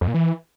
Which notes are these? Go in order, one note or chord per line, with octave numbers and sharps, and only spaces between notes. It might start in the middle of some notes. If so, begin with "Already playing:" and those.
F2
A#2
E3